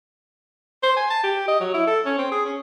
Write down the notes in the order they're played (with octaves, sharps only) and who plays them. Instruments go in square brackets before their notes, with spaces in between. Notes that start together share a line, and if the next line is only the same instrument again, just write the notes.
[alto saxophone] C5
G#5
A5
G4
D#5
F#3
E4
A4
C#4
C4
G#4
C#4